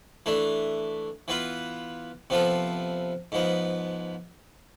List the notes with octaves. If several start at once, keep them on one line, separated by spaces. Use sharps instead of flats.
E3 A3 D4
E3 B3 F4 B4
C3 F3 B3 F4 A4
G#2 F3 B3